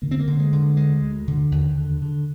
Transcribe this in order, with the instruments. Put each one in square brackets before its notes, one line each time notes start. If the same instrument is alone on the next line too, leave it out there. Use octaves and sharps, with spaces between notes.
[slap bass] D3 A#3
C4
A#3
D3
G#3
D3
D2 G#3
D2
D3
D#2
D3
D3